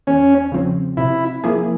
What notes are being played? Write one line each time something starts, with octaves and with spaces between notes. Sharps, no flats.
E2 C#4
C#3 F3 C4
C3 E4
F3 A#3 E4 G#4